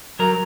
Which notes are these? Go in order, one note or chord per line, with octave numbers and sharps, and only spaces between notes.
F#3 A#4